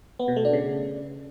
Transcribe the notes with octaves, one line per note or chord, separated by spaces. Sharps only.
B3
B2
A3
D4
C#3